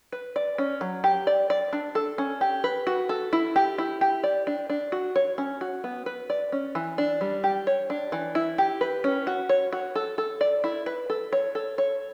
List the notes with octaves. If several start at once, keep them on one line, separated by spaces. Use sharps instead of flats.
B4
D5
C#4
F#3
G4
D5
D5
D4
A4
C#4
G4
B4
F#4
A4
E4
G4
E4
G4
D5
D4
D4
F#4
C#5
C#4
F#4
B3
B4
D5
C#4
E3
D4
G3
G4
C#5
D4
E3
E4
G4
B4
C#4
F#4
C#5
F#4
A4
A4
D5
E4
B4
A4
C#5
A4
C#5